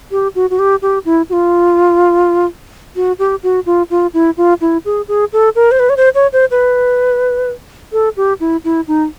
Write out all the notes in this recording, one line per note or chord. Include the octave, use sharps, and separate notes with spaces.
G4
F#4
F#4
G4
G4
E4
F#4
F4
F#4
G4
F#4
F4
F4
E4
F4
E4
G#4
G#4
A4
A#4
C5
B4
C#5
C5
C#5
C5
B4
A4
G4
E4
E4
D#4